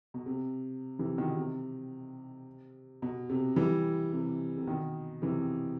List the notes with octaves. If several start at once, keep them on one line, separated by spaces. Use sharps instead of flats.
B2
C3
C3 E3
B2 D#3
C3
B2
C3
E3 G3
C3
C3
B2 D#3
C3 E3